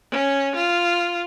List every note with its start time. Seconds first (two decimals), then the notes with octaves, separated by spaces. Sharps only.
0.11 C#4
0.55 F4